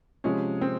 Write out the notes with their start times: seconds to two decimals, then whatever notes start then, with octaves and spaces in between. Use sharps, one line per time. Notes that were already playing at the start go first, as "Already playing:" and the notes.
0.24 C3 F3 G#3 C#4
0.61 C4